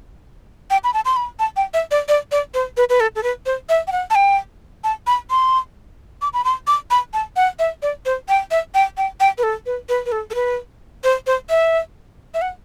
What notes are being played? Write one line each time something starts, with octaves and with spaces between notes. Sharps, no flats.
G5
B5
A5
C6
B5
A5
G5
E5
D5
D5
D5
C5
B4
B4
A4
A4
B4
C5
E5
G5
F#5
A5
G5
A5
B5
C6
D6
B5
C6
D6
B5
A5
F#5
E5
D5
C5
G5
E5
G5
G5
G5
B4
A4
B4
B4
B4
A4
A4
B4
C5
C5
E5
E5
F#5